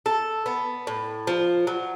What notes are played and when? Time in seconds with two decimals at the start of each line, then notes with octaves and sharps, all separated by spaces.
0.06 A4
0.46 B3
0.87 A2
1.27 F3
1.67 F#3